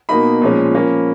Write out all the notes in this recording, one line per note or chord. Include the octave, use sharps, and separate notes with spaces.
B2 A#3 D#4 B5
A#2 F3 G#3 C#4
F3 A#3 C#4